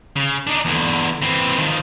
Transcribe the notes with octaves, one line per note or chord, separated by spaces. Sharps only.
C#3
D4 D#4
E2 D3
E3 C4
D#3 F3